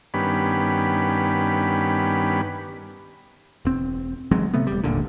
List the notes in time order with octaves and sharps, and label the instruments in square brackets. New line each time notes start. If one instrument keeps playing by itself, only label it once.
[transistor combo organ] G2 D#3 B3 C#4 G4 B5
[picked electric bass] E1 C4
A1 F#3 G#3 C4
C3 A3 B3
E1 G3
G1 D#2 A#2 D3